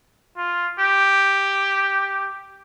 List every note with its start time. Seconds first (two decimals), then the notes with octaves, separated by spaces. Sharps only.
0.37 F4
0.80 G4